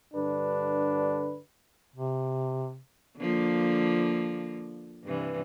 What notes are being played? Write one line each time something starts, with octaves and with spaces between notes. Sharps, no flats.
G2 D3 D4 B4
C3
D3 F3 A#3
G2 C3 E3